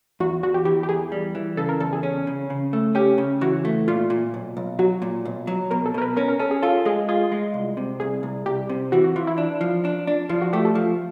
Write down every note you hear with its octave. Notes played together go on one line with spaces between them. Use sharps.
E2 F#4
E2 F#4
G4
E3 G4
G4
E2 G#4
G3
E3
C#3 A4
A#4
E2 A4
G#4
C#4
C#3
C#3
A3
C#4 G4
C#3
E3 F#4
A3
A#2 F4
A#2
B1
B1
F#3 F#4
A#2
B1
F#3
B2 A#4
A4
B2 A#4
B4
C#4 A#4
A#4
C#4 A4
G#4
F4 A4
G#3 G#4
F4 G#4
G#3
C2
C3
C2 G#4
C2
C2 G4
C3
E3 F#4
F#4
E3 F4
E4
D4
F3
D4
D4
F3 F4
F#4
A3 G4
A4
F3